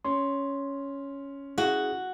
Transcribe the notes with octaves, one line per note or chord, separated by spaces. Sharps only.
C#4 C6
E4 F#4 G#4